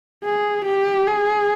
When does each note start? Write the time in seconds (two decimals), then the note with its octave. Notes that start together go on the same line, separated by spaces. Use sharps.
0.25 G#4
0.65 G4
1.07 G#4